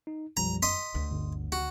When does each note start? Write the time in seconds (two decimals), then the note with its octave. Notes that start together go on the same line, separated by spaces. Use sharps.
0.07 D#4
0.37 B1 F#2 F3 G3 A#5
0.62 D#5 C6 B6
0.95 D2
1.11 G1
1.52 F#4